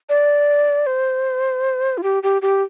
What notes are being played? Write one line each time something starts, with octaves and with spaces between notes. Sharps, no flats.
D5
C5
F4
G4
G4
G4